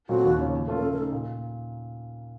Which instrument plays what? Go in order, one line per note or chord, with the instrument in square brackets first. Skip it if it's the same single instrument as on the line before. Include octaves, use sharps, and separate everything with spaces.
[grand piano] A#2 F#3 A3 C4 [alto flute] F#4
[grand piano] D#2
C#3 F3 A#3 C#4
A#2
F3 A3 C#4 F4
[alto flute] A#4
[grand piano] C#3 [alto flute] A4
[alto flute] A#4
[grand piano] A3 D#4 [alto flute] A4
[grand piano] A#2